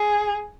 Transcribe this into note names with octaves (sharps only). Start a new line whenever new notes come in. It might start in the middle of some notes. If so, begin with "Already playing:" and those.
Already playing: G#4